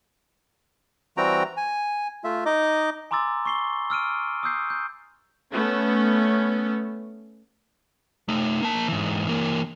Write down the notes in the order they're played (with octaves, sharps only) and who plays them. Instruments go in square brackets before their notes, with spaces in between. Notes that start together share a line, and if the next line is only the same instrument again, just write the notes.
[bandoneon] E3 G3 C4 F#4 G5 A#5
G#5
A3 F4 E5
D#4 D#5 D6
[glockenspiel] G#5 A#5 C6 D6 E6 A6
C#6 C7 G7
E6 F6 D7 D#7
D#6 E6 G6 C7
G6
[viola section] A3 B3 C#4
[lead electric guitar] A3 D#4
A#3 A5
G#2 E3
E3 A#3